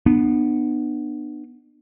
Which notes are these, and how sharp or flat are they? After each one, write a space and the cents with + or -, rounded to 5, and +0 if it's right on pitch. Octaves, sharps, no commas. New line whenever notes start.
B3 -5 D4 +35